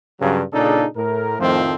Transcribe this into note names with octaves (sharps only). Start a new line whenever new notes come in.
G2 C#3 F#3
A#2 C#3 D4 D#4 G#4 A4
A2 A#4
F2 A2 D#3 F3 A3 C4